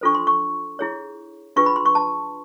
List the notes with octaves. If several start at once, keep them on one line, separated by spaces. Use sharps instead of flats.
D4 F4 A4 C5 C#6
C6
C#6
E4 G#4 C#5
D4 F4 G#4 B4 C#6
B5
C6
C#6
A5